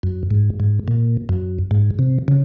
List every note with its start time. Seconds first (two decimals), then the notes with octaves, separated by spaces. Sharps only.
0.03 F#2
0.31 G#2
0.60 G#2
0.88 A#2
1.29 F#2
1.71 G#2
1.99 C3
2.28 C#3